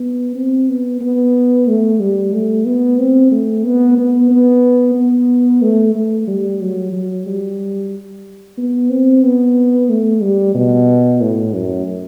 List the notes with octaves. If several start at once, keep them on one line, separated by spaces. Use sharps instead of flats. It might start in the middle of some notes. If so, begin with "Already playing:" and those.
Already playing: B3
C4
B3
B3
A3
G3
A3
B3
C4
A3
B3
B3
B3
B3
A3
A3
G3
F#3
F#3
G3
B3
C4
B3
A3
G3
B2
A2
F#2